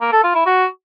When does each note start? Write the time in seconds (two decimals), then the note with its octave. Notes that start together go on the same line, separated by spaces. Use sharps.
0.01 A#3
0.12 A4
0.24 F4
0.35 E4
0.46 F#4